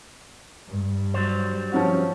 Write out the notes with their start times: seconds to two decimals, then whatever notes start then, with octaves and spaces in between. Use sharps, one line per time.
0.68 G2
1.14 F#3 G3 C5
1.72 F3 C#4 F#4